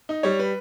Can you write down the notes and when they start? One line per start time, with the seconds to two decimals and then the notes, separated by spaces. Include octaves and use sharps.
0.09 D#4
0.23 G3 C#5
0.39 B4